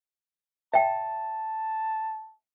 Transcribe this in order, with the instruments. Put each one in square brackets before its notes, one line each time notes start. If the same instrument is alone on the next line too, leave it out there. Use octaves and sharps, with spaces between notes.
[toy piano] E5 G5 [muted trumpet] A5